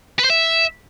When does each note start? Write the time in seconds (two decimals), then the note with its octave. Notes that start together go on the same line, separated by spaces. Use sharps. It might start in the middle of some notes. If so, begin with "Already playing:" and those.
0.19 B4
0.24 C5
0.30 E5